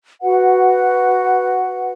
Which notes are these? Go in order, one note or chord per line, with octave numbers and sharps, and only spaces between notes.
F#4 B4 F#5